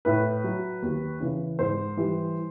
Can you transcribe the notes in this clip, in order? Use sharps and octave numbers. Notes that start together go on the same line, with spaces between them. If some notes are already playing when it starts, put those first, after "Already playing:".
A2 B4
F#3
D#2
C#3 E3
G#2 C5
E3 G3